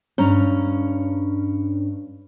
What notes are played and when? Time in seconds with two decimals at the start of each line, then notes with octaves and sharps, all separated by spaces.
0.18 G2 C#4 A#5